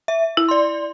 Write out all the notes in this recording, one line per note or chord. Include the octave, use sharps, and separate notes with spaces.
E5
E4
D5 C6